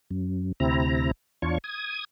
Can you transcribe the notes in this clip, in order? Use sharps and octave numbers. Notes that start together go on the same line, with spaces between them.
F#2
D2 C3 C4 E4 A#5
E2 D4 F4 C#5 C#6
D#6 G#6